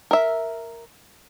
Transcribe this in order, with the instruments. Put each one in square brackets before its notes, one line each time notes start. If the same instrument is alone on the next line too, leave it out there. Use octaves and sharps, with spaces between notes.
[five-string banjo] A#4 E5